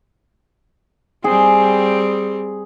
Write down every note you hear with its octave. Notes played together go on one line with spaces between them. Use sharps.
G3 C4 G#4